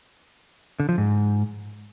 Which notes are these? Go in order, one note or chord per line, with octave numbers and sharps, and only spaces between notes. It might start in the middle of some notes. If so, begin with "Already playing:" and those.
D3
F3
G#2